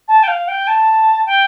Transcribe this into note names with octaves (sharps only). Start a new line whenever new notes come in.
A5
G5
F5
G5
A5
G5